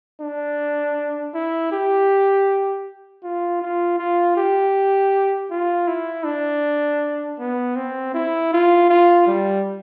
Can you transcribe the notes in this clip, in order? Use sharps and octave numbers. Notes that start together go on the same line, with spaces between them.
D4
E4
G4
F4
F4
F4
G4
F4
E4
D4
B3
C4
E4
F4
F4
G3